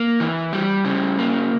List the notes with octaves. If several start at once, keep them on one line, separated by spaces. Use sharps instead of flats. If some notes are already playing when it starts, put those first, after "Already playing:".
Already playing: A#3
E3
G3
C#3
A#3